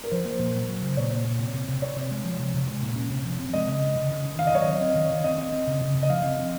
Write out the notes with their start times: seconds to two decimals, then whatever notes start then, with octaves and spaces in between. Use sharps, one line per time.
0.04 A#4
0.11 F3 C5
0.25 A#3
0.39 A#2
0.55 F#3
0.68 F#3
0.82 C#3
0.97 A#2 C#5
1.11 A#2
1.25 A#2
1.39 C3
1.54 C3
1.68 C3
1.82 C3 C#5
1.96 C3
2.11 G#3
2.25 F3
2.39 C3
2.54 C3
2.68 G#3
2.83 A#2
2.96 C#4
3.10 C3
3.25 F3
3.40 C4
3.53 G#3 D#5
3.68 C#3
3.82 C#3
3.96 C#3
4.10 C#3
4.24 C#3
4.38 D#3 F5
4.47 D#5
4.53 F#3 C#5
4.61 D#5
4.67 C4
4.81 C4
4.95 D#3
5.10 D#3
5.24 C4 D#5
5.38 C4
5.53 C4
5.67 C#3
5.81 C#3
5.95 C#3
6.03 D#5
6.09 F3 F5
6.24 C4
6.39 C4